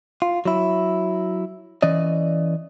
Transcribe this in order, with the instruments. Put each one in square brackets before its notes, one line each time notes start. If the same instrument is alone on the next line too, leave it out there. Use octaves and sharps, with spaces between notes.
[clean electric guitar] F4
F#3 E4
E3 C#4 D5 D#5